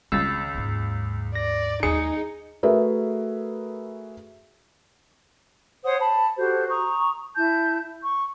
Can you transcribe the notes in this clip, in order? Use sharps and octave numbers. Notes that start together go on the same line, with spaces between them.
C#2 D#3 C4 E6 A6
D#2 G#2
D5 A#6
D#2 G#3 D#4 G#4 C#7
A3 F#4 G#4 A#4 B4 E5
C5 C#5 F#5 D#6
A5 B5
F#4 G4 A4 C5
A#5 C#6 D#6
E4 A5 G6
C#6